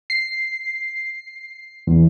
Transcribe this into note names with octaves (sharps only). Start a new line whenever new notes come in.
C7
E2